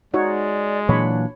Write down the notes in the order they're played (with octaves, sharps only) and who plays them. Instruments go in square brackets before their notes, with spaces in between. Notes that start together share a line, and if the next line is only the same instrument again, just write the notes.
[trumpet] G#3 [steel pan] D#4 F#4 C#5 [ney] D5
[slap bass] A#2 E3 F#3 [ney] D4 [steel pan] C#5 B5